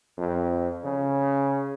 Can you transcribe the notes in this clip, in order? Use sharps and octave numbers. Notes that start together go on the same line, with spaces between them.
F2
C#3